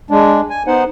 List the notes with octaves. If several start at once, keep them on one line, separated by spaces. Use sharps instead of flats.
G#3 D4
G#5
B3 D#4 C5 F#5